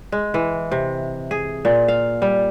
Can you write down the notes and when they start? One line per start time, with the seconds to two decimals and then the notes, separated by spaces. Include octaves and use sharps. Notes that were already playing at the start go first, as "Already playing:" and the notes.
0.12 G#3
0.34 E3
0.72 C3
1.31 G#4
1.65 A#2
1.88 F5
2.22 G3